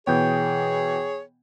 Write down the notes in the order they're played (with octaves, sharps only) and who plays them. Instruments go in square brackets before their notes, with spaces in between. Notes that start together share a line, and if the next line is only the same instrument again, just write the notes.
[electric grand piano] B2 E3 B3 [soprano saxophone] G#4 [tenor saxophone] C#5 [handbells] G5 G6